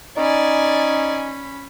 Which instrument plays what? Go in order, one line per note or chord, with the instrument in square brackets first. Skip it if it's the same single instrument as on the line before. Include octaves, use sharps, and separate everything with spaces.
[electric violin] C#4 B5 [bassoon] D#4 [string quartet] D5 G#5